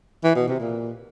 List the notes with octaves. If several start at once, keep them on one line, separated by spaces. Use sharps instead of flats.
E3
B2
C3
A#2